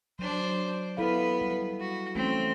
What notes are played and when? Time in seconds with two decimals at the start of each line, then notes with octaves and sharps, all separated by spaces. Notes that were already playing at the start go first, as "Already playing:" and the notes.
0.19 F#3 D4 C5
0.97 B3 E4 A4 B4 F5
1.41 G3
1.80 F#4
2.15 E3 A3 C4 C#4